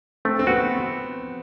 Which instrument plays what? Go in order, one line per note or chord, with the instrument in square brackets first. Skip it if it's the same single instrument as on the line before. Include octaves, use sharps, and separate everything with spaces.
[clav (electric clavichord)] A3 [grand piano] C4
[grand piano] C4
[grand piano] B3 [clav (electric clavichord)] F#4